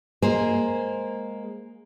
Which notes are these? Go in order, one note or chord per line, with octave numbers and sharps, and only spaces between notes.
G#3 A#3 G#4 C5